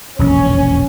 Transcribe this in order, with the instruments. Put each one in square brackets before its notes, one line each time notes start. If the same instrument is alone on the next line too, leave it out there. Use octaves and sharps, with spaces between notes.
[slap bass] E1 A#1 F2 [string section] C#4